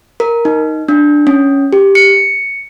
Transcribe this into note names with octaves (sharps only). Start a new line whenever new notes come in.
A#4
D#4
D4
C#4
G4
C#7